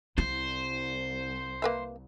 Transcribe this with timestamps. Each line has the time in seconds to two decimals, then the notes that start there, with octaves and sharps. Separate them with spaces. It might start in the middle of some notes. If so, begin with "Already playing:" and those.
0.18 C2 E4 C5
1.62 A#3 B4 E5